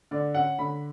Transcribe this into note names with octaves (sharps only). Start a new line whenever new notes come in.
D3 D5
C#4 F#5
D3 B5